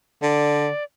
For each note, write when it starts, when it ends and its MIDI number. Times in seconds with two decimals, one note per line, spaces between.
0.22 0.68 50
0.22 0.84 74